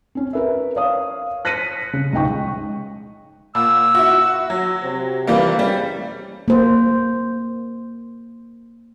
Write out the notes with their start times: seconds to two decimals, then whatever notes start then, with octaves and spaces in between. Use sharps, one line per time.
0.15 C4 C#4
0.33 A#4 B4 E5
0.76 C#5 F5 D#6
1.45 F#6 A#6 B6 C#7 D#7
1.93 C#3
2.13 C#2 G#3 D#4 G5 C#6
3.55 A#2 F#5 E6
3.95 E4 F#4
4.50 F#3
4.83 C3
5.27 E3 G3 A#3
5.59 C#3 G3
6.48 A#3 C5